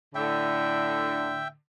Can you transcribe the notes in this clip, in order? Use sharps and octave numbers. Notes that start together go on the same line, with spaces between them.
A2 D3 E5 G5